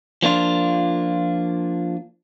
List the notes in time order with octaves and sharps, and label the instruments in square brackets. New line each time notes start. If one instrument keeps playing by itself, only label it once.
[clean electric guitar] F3 A#3 D4 F4